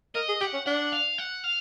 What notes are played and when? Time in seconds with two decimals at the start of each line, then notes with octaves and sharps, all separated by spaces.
0.15 A#4 D#5
0.29 G#4
0.41 G4 F#5
0.53 C#4
0.66 D4 F#5
0.93 F5
1.18 F#5
1.44 F5